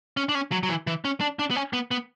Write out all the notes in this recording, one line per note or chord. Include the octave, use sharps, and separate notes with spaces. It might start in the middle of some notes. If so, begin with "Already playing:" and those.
C#4
D4
C#4
F#3
F#3
E3
E3
C#4
D4
D4
B3
C#4
B3
B3